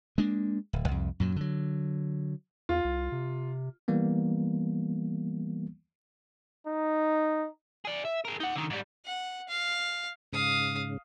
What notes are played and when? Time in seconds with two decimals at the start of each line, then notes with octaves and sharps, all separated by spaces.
0.18 G#3 A#3 D4
0.73 D1
0.88 C2 F2
1.20 F#2 A#2 F#3
1.36 D3 F#3
2.69 E2 F4
2.84 C2
3.12 C3
3.88 E3 G3 A#3 B3
6.67 D#4
7.85 G#4 D5
8.05 E5
8.25 G#4 A#4
8.40 D#4 F#5
8.56 D3 D#3
8.70 G#2 G3
9.06 F#5
9.49 F5
10.33 G#2 C#3 F5 D#6